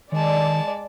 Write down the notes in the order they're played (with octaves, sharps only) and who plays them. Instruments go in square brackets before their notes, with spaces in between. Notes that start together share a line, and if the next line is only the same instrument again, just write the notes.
[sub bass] D#3 [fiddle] G#3 A5 [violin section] D5